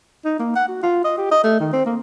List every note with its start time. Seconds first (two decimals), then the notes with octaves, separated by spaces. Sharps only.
0.25 D#4
0.39 A#3
0.56 F#5
0.68 F#4
0.83 F4
1.05 D#5
1.18 G4
1.31 D#5
1.44 A3
1.60 D#3
1.73 C4
1.86 A#3